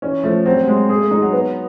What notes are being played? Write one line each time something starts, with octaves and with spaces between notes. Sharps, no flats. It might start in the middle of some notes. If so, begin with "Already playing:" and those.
E3 C#4
F3 A3
F#3 C4
G3
F#3
G#3
A#3 G#4
A3
G#3 D#4
F#3
B3